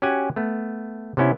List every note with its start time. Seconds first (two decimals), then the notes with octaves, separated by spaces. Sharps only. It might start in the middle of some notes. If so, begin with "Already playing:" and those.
0.02 C#4 F#4 G4 F#5 G#5
0.36 A3 B3
1.17 C3 B3 C#4 E4